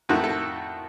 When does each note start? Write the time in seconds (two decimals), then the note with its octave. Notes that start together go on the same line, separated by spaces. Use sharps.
0.09 F2 D#3 A3 F#4
0.24 A4